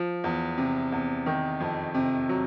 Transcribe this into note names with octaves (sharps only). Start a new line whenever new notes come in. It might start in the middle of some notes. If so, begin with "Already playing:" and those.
Already playing: F3
E2
C3
E2
D#3
F2
C3
F#3